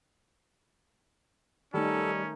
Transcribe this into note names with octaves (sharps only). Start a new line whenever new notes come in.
D#3 G3 A3 C#4 D#4 A4